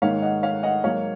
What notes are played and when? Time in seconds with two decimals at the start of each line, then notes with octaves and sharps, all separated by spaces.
0.02 G#2 D#3 A#3 C#5 F5
0.22 D#5 F#5
0.43 C#5 F5
0.63 D#5 F#5
0.84 G#2 F#3 A#3 C#5 F5